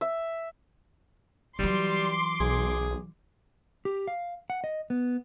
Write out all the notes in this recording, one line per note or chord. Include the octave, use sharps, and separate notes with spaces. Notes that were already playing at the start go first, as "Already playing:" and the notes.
E5
E3 F#3 G3 C6 D6
B1 G#4
G4
F5
F#5
D#5
B3